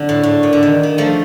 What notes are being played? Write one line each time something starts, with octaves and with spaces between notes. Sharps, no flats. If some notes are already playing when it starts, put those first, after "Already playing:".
Already playing: D3
A2
A2
A#2
D3
D#3
D#3
F3 A3